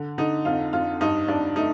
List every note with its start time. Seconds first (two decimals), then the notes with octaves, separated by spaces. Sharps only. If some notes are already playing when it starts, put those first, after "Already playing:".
Already playing: D3
0.18 D3 D#4
0.45 F2 F4
0.73 F2 F4
1.01 G2 D#4
1.28 G2 D4
1.56 A3 D#4